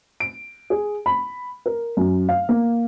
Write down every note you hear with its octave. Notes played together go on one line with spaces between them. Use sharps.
D7
G#4
B5
A#4
F#2
F5
A#3